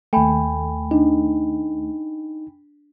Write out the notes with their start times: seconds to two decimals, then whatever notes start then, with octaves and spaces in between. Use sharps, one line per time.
0.13 D#2 A3 G5 G#5 B5
0.91 D4 D#4